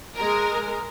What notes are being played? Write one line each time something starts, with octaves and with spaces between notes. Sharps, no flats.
G#3 A#4